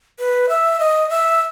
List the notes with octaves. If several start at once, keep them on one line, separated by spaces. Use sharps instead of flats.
B4
E5
D#5
E5